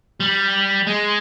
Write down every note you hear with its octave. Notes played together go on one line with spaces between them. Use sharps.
G3
G#3